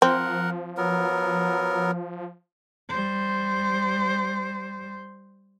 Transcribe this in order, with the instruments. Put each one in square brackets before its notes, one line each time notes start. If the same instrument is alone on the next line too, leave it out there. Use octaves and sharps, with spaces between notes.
[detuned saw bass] F3 [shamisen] C4 [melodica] A#4 F#5
[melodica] F#3 B3 A#4
[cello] G3 C5